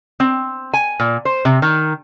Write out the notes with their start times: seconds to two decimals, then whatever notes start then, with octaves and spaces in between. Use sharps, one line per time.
0.20 C4
0.74 G#5
1.00 A#2
1.25 C5
1.45 C3
1.62 D#3